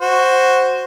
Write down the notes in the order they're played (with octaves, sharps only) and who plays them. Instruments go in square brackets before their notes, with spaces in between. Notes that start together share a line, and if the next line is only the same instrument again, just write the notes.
[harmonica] F#4 C5